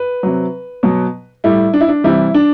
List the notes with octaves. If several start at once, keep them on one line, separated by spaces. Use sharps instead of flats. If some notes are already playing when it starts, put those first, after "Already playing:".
Already playing: B4
C3 F#3
B2 F#3
A2 G3 E4
D4
E4
D4
C3 E3 G3 E4
D4